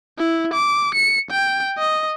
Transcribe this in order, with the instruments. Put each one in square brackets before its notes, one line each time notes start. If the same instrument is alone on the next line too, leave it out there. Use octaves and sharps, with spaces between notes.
[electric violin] E4
D6
C#7
G5
D#5